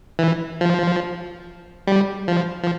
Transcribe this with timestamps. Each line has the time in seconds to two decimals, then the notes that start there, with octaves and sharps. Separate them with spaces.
0.19 E3
0.61 F3
1.87 G3
2.28 F3
2.63 F3